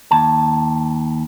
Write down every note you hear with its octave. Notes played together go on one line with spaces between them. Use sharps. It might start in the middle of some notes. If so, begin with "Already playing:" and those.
D#2 A5